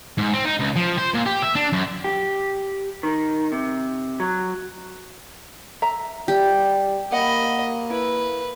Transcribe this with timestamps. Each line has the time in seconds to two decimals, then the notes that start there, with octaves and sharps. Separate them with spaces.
0.18 G#2
0.33 C4
0.45 D#4
0.60 C#2
0.76 F3
0.98 C5
1.14 A#2
1.26 G4
1.42 E5
1.55 D4
1.73 F#2
2.04 G4
3.03 D#3
3.52 C3
4.20 F#3
5.82 E5 A#5
6.28 G3 G4
7.12 A#3 D#5 F#5 B5
7.90 E4 B4